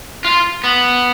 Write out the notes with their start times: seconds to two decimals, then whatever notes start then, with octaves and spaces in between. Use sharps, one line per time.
0.25 F4
0.64 B3